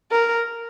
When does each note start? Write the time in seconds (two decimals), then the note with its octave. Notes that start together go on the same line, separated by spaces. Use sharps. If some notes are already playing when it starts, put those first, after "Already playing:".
0.11 A#4